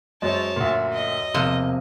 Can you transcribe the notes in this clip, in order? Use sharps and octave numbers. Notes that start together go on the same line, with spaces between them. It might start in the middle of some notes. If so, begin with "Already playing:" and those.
F#2 G#3 C5 C#5 A5
D2 A#2
D#5
E1 C3 F3 A#3 D#7